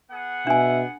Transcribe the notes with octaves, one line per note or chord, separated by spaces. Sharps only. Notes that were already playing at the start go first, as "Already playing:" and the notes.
B3 G#4 F#5
B2 D4 E5 G#5